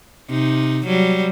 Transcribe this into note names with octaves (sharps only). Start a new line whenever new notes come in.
C3 D#4
F#3 G3